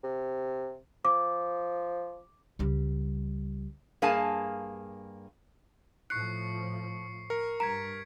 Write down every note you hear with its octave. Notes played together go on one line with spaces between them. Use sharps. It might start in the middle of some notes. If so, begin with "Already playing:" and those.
C3
F3 D6
C#2 G3
G2 A#3 G#4 F5 G#5 A5
A2 F3 C#6 F#6 C7 C#7
A#4 C#7
G2 A#5 G#6 B6 D7